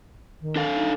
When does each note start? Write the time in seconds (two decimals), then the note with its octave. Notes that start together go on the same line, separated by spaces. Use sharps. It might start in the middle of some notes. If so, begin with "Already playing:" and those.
0.41 D#3
0.56 D4 A4 F5
0.75 D#4